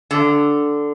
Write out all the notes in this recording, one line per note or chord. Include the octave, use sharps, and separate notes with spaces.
D3